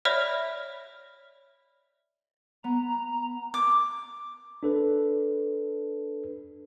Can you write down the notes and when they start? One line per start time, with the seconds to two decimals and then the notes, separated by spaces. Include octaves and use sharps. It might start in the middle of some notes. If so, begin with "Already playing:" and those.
0.05 C#5 D5 E5 B5 F6 B6
2.64 B3 A#5
3.54 D6
4.63 D4 A4 B4